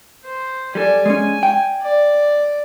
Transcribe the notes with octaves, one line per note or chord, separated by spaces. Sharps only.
C5
G3 A4 D5 G#5
G#3 C#4 G#5
G5
D5